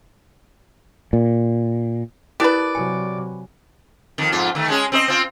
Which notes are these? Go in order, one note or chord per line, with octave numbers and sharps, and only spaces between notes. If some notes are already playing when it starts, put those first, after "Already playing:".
A#2
E4 G4 A#4 B4 D5
C3 F#3 G#5
F2 D#3
F2 G#2 F4
D#3 A3
G#3 C#4 G#4
C4 A#4 D#5
C4 F4